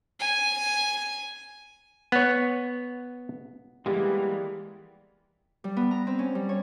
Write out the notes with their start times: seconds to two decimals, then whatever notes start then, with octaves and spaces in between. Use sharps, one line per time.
0.20 G#5
2.12 B3 C#5
3.86 E3 G3 G#3 A#3 B3 G4
5.64 G3
5.77 B3
5.91 A#5
6.07 C4
6.19 C#4
6.35 G3
6.49 C#5